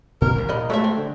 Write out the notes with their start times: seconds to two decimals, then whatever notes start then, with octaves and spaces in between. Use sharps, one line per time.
0.21 A#2 A#4
0.35 A#1 A2 C4
0.49 A#2 D3 D#5 B5
0.70 F#3 G#3 A3 E5
0.84 C4
0.97 D3